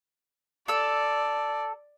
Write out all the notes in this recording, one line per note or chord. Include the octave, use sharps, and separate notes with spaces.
A4 D5 E6